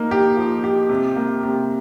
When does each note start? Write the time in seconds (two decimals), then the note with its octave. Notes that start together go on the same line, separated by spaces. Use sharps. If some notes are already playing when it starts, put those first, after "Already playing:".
Already playing: A#3 D#4
0.11 G4
0.37 F3
0.64 G4
0.89 C3
1.16 A#3
1.43 C3